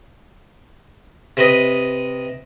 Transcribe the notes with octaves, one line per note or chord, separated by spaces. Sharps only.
C3 B4 D#5